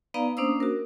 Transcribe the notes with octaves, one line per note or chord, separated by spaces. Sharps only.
B3 D#4 B4 D5 F5 A#5
A#3 C#4 D4 C5 D#6 E6
F#4 A#4